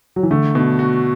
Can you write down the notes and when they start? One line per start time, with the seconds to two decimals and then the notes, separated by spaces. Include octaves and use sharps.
0.16 F#3
0.23 E3
0.31 D3 A3
0.55 B2
0.79 F#4